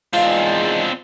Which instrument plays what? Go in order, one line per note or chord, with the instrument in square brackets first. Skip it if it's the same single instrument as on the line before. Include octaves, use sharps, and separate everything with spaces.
[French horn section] E2 D#3 G#3 [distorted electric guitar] C4 D4 [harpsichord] F4